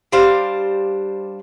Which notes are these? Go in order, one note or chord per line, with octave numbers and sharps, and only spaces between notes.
G3 D4 C5 F5